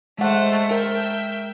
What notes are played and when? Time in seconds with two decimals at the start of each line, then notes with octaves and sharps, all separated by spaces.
0.19 G#3 A3 C5 F#5
0.71 A#4 E5 G5